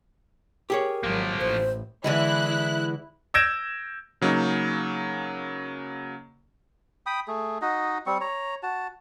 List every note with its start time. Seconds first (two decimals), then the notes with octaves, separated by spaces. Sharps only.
0.70 G4 G#4 A#4 C#5
1.03 G#1 F3 F#3 A#3
1.41 A1 A2 C5
2.04 D3 E3 G#3 E4 F#6
3.34 E6 G6 G#6 A#6 D7 E7
4.21 C#3 F#3 A#3 C#4 D#4
7.06 G5 B5 D#6
7.28 A3 G#4
7.62 D#4 F#4 D#5
8.06 G3 C4 C#6
8.21 C#5 A#5
8.63 F#4 A5